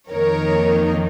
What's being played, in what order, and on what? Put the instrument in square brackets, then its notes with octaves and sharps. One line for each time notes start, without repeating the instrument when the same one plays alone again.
[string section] F2 D#3 A#3 D#4 A#4 C#5